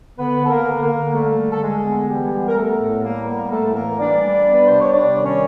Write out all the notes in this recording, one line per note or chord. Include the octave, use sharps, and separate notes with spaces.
D3 B3 B4
D3 A4
A#3 A#4
D3
A#3 A#4
D3
G3 A3 A4
D3
A4
D3 G#3 G#4
B3
E3 G3 G4
B3
A#4
A3 B3 A4
A2
G3 A#3 A#4
A#3 B3 A#4
A2 A3 A4
E3 A#3 A#4
G3 D4 D5
G3
B3
B4
C3 C5
C#5
G3 D4 D5
D#3
C#4 C#5